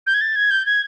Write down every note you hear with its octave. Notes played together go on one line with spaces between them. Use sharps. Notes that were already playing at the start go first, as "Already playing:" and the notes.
G6
G#6
A6
G#6
G6
G#6